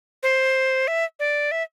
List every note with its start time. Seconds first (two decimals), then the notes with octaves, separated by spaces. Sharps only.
0.23 C5
0.88 E5
1.20 D5
1.52 E5